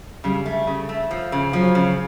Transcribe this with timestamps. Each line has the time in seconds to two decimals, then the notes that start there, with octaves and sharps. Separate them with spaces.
0.24 C#3 G3
0.46 A3
0.67 C#3
0.89 A3
1.11 F3
1.32 C#3
1.53 F3 F#3
1.75 C#3